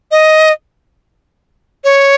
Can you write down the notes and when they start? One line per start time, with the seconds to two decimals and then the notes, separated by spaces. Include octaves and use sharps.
0.11 D#5
1.84 C#5